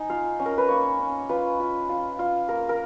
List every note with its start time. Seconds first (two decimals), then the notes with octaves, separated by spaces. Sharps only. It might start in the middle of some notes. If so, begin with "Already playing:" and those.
Already playing: D#4 G#5
0.10 F4 F5
0.40 C#4
0.46 A#4
0.58 B4
0.69 A#3 C#5
0.99 C#4
1.29 F4 B4
1.60 F4
1.89 F4
2.19 F4
2.49 A#3 A#4
2.69 A#4